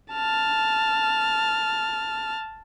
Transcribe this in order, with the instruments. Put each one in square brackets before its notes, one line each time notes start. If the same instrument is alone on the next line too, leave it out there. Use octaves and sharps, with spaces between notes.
[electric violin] A5 F6